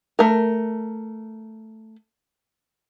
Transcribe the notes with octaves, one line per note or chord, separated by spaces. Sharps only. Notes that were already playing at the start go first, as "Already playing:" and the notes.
A3 A#4